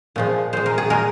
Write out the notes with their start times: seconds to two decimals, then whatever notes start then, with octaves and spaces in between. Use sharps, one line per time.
0.16 A#2 F3 G#3
0.53 A#2 G#3 C5
0.66 A#4
0.78 G#4
0.90 A#2 G#3 A#4